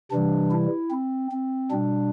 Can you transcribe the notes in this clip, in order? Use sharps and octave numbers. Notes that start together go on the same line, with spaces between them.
C3 E3 G3 D4
E4
C4
C4
B2 G3 D4